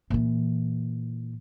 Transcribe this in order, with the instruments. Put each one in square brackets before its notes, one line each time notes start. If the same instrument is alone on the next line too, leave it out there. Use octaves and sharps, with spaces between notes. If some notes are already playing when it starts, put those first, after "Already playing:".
[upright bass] A#2 E3